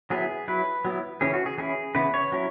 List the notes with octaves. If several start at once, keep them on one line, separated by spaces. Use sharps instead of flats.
F#3 B3 E4 G#4
F#3 E4 B4
F#3 B3 E4
C#3 E3 C#4 G#4
F#4
G#4
E3 C#4 E4 G#4
C#3 E3 B3 E4 B4
C#5
F#3 C#4 E4